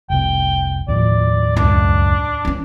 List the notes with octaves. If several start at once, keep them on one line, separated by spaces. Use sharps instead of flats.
F1 C2 C3 G5
D#2 A2 F3 D5
C#2 F#2 D4
E3 C#4